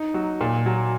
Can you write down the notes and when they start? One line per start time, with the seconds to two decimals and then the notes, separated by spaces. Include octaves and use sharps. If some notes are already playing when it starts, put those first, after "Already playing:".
Already playing: D#4
0.14 F#3
0.41 A#2
0.66 F#3